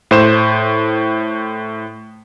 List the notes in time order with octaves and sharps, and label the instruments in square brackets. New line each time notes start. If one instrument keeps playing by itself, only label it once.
[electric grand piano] A2 C5 E7